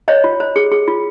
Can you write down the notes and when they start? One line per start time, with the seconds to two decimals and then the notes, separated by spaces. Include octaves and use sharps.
0.08 C5 C#5 D#5
0.24 F4
0.40 C5
0.56 G#4
0.71 G#4
0.88 F4